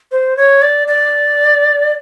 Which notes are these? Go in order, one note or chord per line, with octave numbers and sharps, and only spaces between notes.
C5
C#5
D5
D5